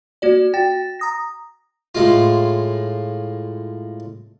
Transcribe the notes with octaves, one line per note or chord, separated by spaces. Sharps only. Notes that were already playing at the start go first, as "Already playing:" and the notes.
A#3 F#4 D5
F#4 G5 A6
A#5 D#6 A#6
A2 G#3 F4